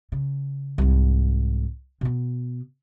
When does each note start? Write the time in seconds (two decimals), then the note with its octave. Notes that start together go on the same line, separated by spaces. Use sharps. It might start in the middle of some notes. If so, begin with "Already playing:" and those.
0.12 C#3
0.78 C2 G#2
2.01 B2 B3